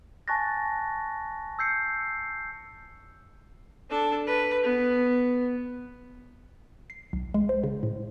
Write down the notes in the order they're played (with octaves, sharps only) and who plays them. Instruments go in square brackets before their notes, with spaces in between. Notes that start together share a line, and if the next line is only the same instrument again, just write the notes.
[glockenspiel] G#5 A5 C#6 F#6 A6 A#6
E6 G6 C7 C#7
[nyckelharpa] D4 A4
B4
B3
[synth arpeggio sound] C7
B1
G#3
C5
C#3
A2